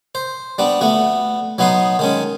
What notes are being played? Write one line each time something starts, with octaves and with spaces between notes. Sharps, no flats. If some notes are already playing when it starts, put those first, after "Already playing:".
C5
G3 B3 D4
A3 B3 F#4
F#3 B3 D#4 B4 C6 D#6
D#3 G#3 C#4